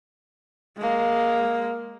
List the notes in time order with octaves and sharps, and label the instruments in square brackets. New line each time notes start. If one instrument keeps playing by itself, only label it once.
[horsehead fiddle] G#3 A#3